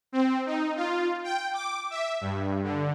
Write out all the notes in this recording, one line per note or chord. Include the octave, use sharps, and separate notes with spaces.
C4
D#4
F4
G5
D6
E5
G2
D3